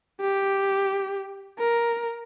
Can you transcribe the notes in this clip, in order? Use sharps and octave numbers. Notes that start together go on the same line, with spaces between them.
G4
A#4